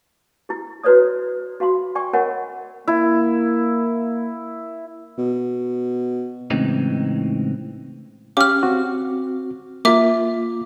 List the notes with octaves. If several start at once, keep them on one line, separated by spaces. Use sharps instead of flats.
E4 G4
E4 F#4 B4 C#5 D5 D#6
F#4 F5 B5 C6
D5 G5 G#5 C#6
A#4 C#5 D#5 F#5 G#5 B5
A#3 E4
B2
A2 C#3 E3 G#3 C4 D#4
C#4 G4 F5 D6 F6
C4 F#4
A#3 F4 E5 D6